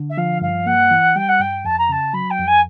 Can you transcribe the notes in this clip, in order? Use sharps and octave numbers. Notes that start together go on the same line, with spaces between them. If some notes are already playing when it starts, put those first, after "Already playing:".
Already playing: D3
E5
F3 F5
G2 F5
A#3 F#5
E3
G3 G5
F#5
G2 G5
F2 A5
A#5
C#3 A5
F#3 B5
G5
F2
G#5